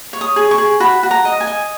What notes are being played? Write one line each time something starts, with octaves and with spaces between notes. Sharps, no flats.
C#5
D#6
G#4
C#6
G#4
F#4 B5
F#4
A#5
D#5
G#5
D#5